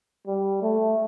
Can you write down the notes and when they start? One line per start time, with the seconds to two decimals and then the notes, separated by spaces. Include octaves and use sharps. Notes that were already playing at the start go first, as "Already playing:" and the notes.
0.27 G3
0.62 A3